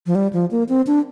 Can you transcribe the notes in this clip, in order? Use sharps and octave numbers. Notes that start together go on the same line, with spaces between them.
F3
G3
F3
A#3
C4
D4